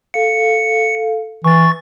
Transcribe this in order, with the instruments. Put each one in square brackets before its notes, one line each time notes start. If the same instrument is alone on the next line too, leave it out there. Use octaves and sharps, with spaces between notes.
[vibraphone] A4 F5 [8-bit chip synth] C#7
[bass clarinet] E3 [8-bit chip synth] C#6 A6